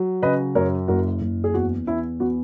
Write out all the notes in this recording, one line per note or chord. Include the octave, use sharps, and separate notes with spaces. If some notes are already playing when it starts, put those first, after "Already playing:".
Already playing: F#3
C#3 B4 D#5
F#2 A#4 C#5
F#1 F#4 A#4
F#1
G#4
E2 F#4
E2 E4
B3 F#4